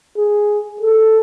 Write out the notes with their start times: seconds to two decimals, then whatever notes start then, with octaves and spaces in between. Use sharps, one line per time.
0.18 G#4
0.81 A4